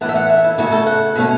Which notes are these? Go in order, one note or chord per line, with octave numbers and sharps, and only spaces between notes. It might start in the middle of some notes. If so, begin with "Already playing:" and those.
E3 A3 C#4 F#5
E5
F#5
E5
E4
C#3 A3 C#4 F#4
A4
F#5
B2 A3 C#4